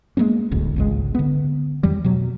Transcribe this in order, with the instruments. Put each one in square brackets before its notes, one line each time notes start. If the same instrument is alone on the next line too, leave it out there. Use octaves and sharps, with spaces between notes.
[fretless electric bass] G#3 A#3 B3 C#4
D#1 A1 D2
G#1 C#2 G#3
D3 B3
F2 D#3 F#3 G3
B2 F#3